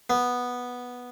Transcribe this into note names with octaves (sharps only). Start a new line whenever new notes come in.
B3